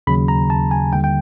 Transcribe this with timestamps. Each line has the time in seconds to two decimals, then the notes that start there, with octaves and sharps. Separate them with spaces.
0.07 D#2 C#3 F#3 B5
0.28 A#5
0.50 A5
0.71 G#5
0.92 D#2 D3 G3 G5
1.04 G5